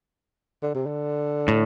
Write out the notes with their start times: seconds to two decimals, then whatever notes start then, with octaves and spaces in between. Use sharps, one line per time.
0.63 D3
0.75 C3
0.86 D3
1.48 A2